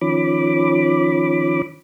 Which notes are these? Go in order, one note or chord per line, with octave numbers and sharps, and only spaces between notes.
D#3 F3 C#4 B5 D6